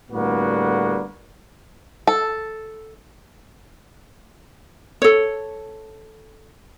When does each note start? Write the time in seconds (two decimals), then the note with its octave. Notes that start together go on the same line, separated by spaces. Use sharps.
0.10 A2 D3 G3 A#3 B3 F#4
2.07 A4
5.02 A4 C#5